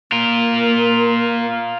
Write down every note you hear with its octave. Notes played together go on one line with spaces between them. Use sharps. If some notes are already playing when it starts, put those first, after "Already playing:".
A#3 F4 A#4